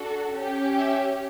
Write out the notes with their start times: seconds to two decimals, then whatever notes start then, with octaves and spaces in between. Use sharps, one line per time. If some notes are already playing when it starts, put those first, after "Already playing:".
Already playing: D4 F#4 A4
0.33 C#4 G4
0.77 E5